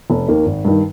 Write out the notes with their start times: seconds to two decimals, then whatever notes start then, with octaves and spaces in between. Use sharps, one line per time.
0.10 F1
0.28 D#2 D#3 A#3
0.46 G#1
0.65 G2 D#3